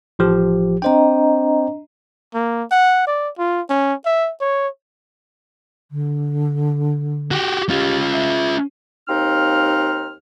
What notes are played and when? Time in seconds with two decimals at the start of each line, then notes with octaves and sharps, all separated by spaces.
0.19 A1 F3 G4
0.82 C4 D4 C5 D#5 G5 A#5
2.35 A#3
2.71 F#5
3.07 D5
3.38 F4
3.70 C#4
4.06 E5
4.41 C#5
5.91 D3
7.31 F#4 G4
7.70 C#4 F4 G4
8.13 E5
9.08 D#2 C4 D#4 F5 F6